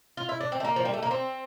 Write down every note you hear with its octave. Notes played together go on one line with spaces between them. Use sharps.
F4
E4
D4
C4
A3
A#3
F3
G3
A3
A#3
C4